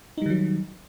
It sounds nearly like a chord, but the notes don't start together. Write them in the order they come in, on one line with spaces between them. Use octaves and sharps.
D#4 G3 D#3 F#3